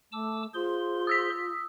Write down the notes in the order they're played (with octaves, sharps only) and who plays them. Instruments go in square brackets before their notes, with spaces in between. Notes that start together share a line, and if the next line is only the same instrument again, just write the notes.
[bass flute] A3 [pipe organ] A5 D6 E6
[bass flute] F4 [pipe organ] G#4 C5 C6
[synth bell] D#6 E6 B6